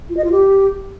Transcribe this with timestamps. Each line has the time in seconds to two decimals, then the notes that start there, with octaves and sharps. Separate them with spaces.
0.10 F4
0.17 D#5
0.24 F4
0.32 G4